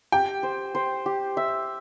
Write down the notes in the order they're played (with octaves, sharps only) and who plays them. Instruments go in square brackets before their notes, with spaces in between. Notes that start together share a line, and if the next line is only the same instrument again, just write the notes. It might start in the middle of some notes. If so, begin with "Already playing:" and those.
[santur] G4 [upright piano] G5
[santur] C5
C5
G4
E5